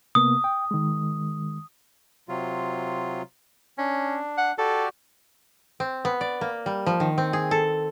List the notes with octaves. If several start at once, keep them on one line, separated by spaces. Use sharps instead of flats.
C3 A#3 B3 D#6
G5
D#3 G#3
C3 F#3 F4
C#4 D4
F#5
F#4 G4 A4 D5
C4
B3
D5
A#3
G3
F3
D#3
C4
G#4
A4